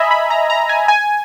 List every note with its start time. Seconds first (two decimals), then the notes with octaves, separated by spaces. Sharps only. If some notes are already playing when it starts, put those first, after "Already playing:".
Already playing: D#5 E5 G#5 A#5 B5
0.11 B5
0.30 A#5
0.50 A#5
0.69 G#5
0.88 G#5